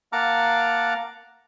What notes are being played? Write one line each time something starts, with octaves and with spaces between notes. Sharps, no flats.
A#3 F#5 A5 A#5 D6 F6